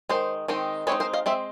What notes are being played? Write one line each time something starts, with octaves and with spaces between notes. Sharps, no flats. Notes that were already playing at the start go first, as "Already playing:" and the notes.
D#3 G#3 C5
D#3 G#3 C4 D#4
G#3 C4 D#4 B4 C#5
A#4 C5
D#5 F5
G#3 C4 E5